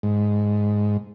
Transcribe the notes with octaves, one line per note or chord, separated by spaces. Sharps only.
G#2